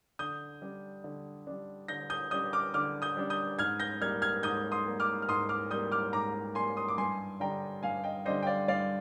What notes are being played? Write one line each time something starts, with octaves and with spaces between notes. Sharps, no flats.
D3 D#6 G6
G3 D4
D3
G3 D4
D3 G6 A#6
D#6 G6
G3 D4 D#6 G6
D6 F6
D3 D6 F6
D#6 G6
G3 D4
D#6 G6
G#2 F6 G#6
G6 A#6
G3 A#3 F6 G#6
F6 G#6
G#2 D#6 G6
C6 D#6
G3 A#3
D6 F6
F6
G#2 C6 D#6
D6 F6
G3 A#3 D#6 G6
D6 F6
G#2 A#5 D6
G3 A#3 G#5 C6
C6 D#6
D6
G2 G#5 C6
D3 G3 D4 G5 A#5
G2 F5 G#5
D#5 G5
D3 G3 D4 C5 D#5
G5
D5 F5
G2 D5 F5